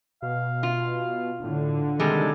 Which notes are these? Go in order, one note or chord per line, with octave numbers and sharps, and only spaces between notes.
B2 F5
F4
A2 D3
C3 D#3 G3 G#3 A4